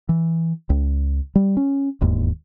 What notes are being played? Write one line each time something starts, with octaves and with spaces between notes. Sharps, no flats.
E3
C#2
G3
C#4
E1 D#2 G#2